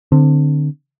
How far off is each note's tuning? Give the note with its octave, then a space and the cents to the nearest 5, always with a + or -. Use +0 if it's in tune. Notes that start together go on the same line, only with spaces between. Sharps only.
D3 +20 C4 +0